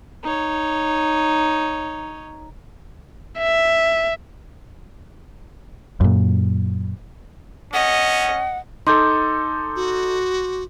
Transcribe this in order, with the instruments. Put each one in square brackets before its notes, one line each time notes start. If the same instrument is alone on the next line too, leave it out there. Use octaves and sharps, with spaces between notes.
[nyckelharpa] D#4 C#5
[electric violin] E5
[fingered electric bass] F#2 A#2
[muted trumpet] C#4 [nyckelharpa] D#5 [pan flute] F#5
[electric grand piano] D#4 A4 [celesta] C6 D6 G6
[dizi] F#4